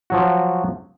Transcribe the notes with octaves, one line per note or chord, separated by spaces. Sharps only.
F3 F#3 F#4